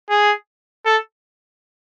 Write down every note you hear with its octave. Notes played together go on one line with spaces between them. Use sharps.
G#4
A4